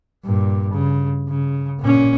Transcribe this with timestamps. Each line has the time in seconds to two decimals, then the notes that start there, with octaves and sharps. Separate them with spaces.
0.25 G2 A#2
0.73 C#3
1.30 C#3
1.80 A#2 C#4